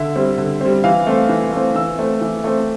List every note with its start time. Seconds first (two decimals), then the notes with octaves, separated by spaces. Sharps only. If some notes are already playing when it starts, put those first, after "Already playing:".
Already playing: D3 E5
0.16 G3 C4
0.38 D3
0.61 G3 C4
0.84 E3 F5
1.07 A3 C4
1.29 E3
1.52 A3 C4
1.75 E3 E6
1.99 A3 C4
2.21 E3
2.44 A3 C4